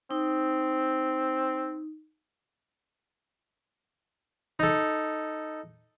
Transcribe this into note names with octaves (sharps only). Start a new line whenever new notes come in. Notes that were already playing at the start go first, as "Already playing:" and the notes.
C4 D#4
D#4 A4